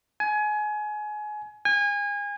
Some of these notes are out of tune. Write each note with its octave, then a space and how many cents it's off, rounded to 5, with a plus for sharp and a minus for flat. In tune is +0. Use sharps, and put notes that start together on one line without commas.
G#5 +25
G#5 -30